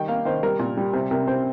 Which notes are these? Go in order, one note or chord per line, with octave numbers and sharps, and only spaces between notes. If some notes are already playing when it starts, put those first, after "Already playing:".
Already playing: D#3 G3 G5
A#3 F5
D#3 C5
G3 A#4
A#2
G3
C3 C5
C3 A#4
C3 C5